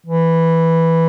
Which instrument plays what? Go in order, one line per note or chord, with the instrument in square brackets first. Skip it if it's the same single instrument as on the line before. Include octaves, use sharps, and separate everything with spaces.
[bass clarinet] E3